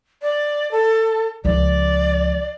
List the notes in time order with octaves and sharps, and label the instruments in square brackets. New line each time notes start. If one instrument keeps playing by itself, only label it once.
[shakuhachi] D5
A4
[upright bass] C#2 F3 [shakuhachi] D5